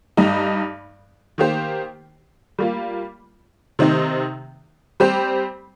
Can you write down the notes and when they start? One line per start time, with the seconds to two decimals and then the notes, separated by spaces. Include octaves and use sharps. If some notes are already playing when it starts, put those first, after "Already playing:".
0.17 G2 G3 D#4
1.38 D#3 A#3 G4 C5
2.59 G3 A#3 F4
3.79 C3 D#3 C4 D#4
5.00 G3 C4 G4 C5